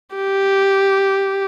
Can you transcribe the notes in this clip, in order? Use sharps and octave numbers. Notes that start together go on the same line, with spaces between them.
G4